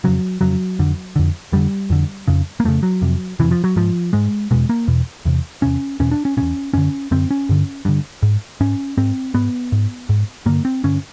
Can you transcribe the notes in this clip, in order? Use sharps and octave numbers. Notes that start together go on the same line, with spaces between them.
F2 C#3 F#3
F2 C#3 F#3
F2 D3
F2 D3
F2 D3 G3
F2 D3
F2 C#3
A#3
F2 C#3 A3
F#3
F2 C3
F2 C3 E3
F3
F#3
G#2 F3
G#2 G#3
E2 B2 G#3
A#3
E2 B2
E2 C3
E2 C3 C#4
E2 B2 C#4
D4
C#4
E2 B2 C#4
F#2 D3 C#4
F#2 D3 C4
C#4
G2 D3
G2 D3
G#2
G#2 C#4
G#2 C4
G#2 B3
G#2
G#2
G2 D3 A#3
C4
G2 D3 C#4